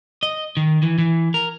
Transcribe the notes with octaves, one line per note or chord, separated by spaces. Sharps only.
D#5
D#3
E3
E3
A#4